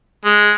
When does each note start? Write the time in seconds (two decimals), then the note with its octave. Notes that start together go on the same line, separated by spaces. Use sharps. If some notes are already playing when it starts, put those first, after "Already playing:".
0.25 G#3